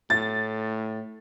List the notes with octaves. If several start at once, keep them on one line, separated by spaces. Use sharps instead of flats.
A2 A6